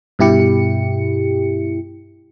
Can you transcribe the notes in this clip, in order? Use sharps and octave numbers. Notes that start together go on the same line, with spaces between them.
G2 B2 E4 G4 C#7